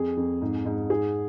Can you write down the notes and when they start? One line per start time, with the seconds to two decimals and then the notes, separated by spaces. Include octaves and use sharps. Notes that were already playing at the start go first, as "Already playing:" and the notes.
Already playing: F2 G#4
0.17 F2
0.41 G#2
0.65 G#2
0.90 G#2 G#4